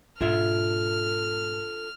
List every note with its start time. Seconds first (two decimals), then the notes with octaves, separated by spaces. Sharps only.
0.21 G#2 B2 D4 F4 A4 E5 F6